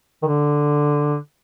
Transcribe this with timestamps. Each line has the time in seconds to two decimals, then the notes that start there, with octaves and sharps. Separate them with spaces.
0.23 D#3
0.27 D3